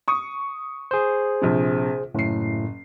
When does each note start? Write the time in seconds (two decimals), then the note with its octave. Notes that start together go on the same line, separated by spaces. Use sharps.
0.08 C#6 D#6
0.91 G#4 C5
1.42 A#1 C3
2.14 F#1 A2 C7